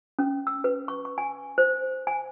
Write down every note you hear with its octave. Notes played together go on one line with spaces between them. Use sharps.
C#4
E6
B4
C#6
C#6
G#5
C5
G#5